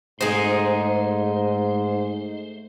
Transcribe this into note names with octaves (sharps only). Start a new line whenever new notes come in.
G#2 A3 D#4 G#4 C5